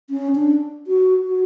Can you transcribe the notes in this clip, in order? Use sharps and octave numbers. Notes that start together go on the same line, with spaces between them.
C#4
D4
F#4
F#4